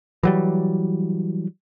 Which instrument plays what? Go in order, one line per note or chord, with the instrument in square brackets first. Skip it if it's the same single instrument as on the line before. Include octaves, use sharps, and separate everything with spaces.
[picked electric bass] E3 F#3 G3